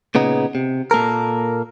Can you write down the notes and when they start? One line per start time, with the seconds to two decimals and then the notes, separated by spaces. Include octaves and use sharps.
0.15 A#2 C#3 B3 D#4
0.55 C3
0.91 A#2 A#3 A4 A#4